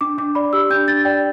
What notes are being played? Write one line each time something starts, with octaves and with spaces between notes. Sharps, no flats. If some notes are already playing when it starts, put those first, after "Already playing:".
D4 D6
D4 D6
D5 B5
G4 E6
D4 G6
D4 A6
D5 G5